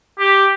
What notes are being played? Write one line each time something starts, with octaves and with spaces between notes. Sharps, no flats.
G4